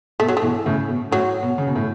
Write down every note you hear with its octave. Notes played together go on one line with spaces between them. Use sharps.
B2 A3
F#3
A3
B2 E3
A2 C#3
B2
A2 F#3
B2
C#3
B2
A2